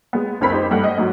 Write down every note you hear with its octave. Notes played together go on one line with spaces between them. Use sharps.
G#3 B3
F#1 C#2 C4 A#4 B5 B6
D#4 G4 C5
G2 A3 F#5
D#5
G#2 F#3